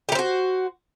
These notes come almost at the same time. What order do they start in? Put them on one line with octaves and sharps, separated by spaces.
G4 A#4 C5 F#4